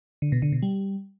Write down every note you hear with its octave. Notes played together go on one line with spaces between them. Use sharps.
D3
B2
D3
B2
G3